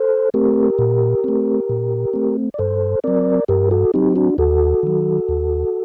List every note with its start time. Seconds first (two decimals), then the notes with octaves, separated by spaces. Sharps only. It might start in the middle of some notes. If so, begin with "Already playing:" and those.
Already playing: A4 C5
0.34 A3 C4 G4 A#4
0.79 A#2
1.24 A3 C4
1.69 A#2
2.14 A3 C4
2.54 D5
2.59 G2 A4 C5
3.04 F#3 C4 A#4 D5
3.48 G2 G4 A#4
3.71 F#4 A4
3.94 F#3 C4 D#4 G4
4.16 D4 F#4
4.38 D#2 F#4 A4
4.83 D#3 F#3
5.29 D#2